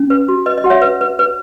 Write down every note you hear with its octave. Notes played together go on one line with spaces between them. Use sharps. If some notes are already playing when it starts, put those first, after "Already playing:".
Already playing: C#4
B4
F#4
B4 D#5
D#5
F#4 F#5
C#5 E5
B4
B4
B4